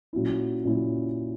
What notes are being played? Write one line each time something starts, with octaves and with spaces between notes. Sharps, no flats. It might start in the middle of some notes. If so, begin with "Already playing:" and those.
A#2 F#3 C#4 E4
A#2 F#3 C#4 E4